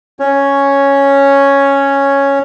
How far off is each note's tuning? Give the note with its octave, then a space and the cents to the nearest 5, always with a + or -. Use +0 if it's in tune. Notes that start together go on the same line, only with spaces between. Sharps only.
C#4 +0 C#5 +0 C#6 +0